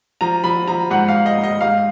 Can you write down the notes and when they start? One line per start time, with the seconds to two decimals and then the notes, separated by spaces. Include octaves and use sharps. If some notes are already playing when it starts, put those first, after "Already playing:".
0.21 F3 A#5
0.44 F3 B5
0.68 F3 A#5
0.91 G#2 F#5
1.08 F5
1.14 G#2
1.26 D#5
1.37 G#2
1.43 D#5
1.61 G#2 F5